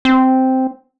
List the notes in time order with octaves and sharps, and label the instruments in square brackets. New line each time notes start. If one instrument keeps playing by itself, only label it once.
[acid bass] C4